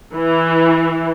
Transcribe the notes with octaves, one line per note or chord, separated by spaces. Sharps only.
E3